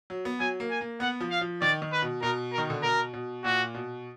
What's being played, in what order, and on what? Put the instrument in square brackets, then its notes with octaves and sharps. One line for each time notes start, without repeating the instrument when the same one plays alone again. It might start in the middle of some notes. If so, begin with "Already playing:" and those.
[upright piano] F#3
B3
[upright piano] F#3 [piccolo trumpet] G#5
[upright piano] A#3
[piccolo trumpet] G#5
[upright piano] A#3
[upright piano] B3 [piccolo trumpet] F#5
[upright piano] F3
[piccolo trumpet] F5
[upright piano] F3
[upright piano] D#3 [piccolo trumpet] D5
[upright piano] D#3
[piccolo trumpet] B4
[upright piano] B2
[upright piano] B2 [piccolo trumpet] A#4
[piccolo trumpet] A#4
[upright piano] D#3
D3
[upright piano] B2 [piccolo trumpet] A#4
[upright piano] B2
[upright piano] A#2 [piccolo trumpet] F#4
[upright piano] B2